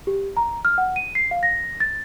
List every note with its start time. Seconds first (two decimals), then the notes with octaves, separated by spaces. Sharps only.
0.07 G4
0.37 A#5
0.65 F6
0.78 F#5
0.96 D#7
1.15 C7
1.31 F5
1.43 A#6
1.80 A6